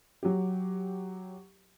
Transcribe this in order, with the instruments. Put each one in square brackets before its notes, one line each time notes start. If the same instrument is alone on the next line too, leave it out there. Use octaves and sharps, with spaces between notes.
[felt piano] F#3 G4